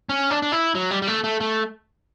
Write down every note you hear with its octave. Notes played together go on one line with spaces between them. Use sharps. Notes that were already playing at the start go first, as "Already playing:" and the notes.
C#4
D4
D4
E4
F#3
G3
G3
A3
A3
A3